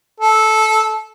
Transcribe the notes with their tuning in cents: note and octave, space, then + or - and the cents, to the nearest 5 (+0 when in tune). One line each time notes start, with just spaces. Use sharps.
A4 -15